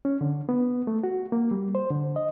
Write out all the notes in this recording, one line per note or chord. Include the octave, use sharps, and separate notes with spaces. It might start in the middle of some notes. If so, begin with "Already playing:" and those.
C#4
D3
B3
A3
F#4
A#3
G3
C5
D3
D#5